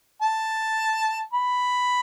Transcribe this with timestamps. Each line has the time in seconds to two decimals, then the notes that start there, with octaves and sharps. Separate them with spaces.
0.22 A5
1.33 B5